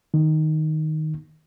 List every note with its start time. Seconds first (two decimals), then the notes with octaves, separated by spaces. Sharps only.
0.14 D#3